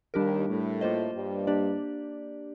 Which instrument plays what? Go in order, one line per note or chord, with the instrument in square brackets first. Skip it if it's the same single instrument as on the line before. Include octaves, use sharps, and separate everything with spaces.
[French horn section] D#2 D#3 [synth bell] G3 D4 G4 A#4
[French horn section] A2 A3
[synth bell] A#3 F4 C5 D#5
[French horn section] G2 G3
[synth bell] A#3 D4 G4 D5